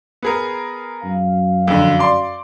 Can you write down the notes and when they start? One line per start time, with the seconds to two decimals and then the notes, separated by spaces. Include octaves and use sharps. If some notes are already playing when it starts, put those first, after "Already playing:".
0.23 B3 G#4 A#4
1.04 F#2 F5
1.68 F2 D3
1.99 D5 C6 D6